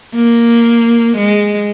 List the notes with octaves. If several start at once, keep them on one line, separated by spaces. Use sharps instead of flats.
A#3
G#3